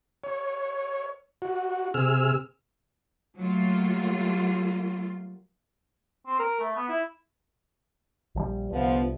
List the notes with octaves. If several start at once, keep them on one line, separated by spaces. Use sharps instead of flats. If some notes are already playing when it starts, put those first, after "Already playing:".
C#5
F#4
C3 G#4 E6 F6
F#3 G3 A3 A#3 F4
C4
A#4
A3
B3
E4
A#1 F3 G3
C2 D3 F3 B3